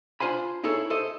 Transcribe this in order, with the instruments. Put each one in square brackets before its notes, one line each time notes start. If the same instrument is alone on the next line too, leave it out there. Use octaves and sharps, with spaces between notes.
[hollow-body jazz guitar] D4 F4 C5 G#5 B5
D#4 E4 G#4 A4 C#5
A4 C5 D#5 E5